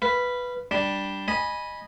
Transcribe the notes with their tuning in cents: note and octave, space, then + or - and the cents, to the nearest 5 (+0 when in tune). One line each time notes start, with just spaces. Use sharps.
B4 +0 F5 -20
G3 +0 D4 +0
D#5 -15 G#5 +0 B5 -15